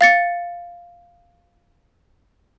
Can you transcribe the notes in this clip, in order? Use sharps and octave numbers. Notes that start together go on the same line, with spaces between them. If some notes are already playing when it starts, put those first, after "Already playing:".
F5 A6 C#7